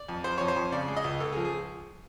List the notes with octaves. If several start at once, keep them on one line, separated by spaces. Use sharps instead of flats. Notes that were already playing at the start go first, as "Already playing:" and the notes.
Already playing: D5
F2
F2 C5
F2 C#5
C5
F2
C#3 D5
G#3
D#5
C#2
C#2 A4
G#4
F3
G#4